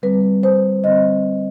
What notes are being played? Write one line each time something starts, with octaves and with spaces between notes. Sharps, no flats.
D3 G3 C4 B4
C5
D3 G3 C4 D#5